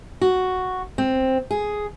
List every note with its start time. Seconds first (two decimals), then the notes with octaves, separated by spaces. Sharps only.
0.21 F#4
0.98 C4
1.51 G#4